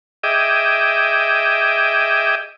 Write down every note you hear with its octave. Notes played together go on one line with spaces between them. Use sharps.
G#4 D#5 E5 G5 D6